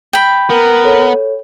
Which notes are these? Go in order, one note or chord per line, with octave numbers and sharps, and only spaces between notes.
G5 B5
B3 A#4
A4 C#5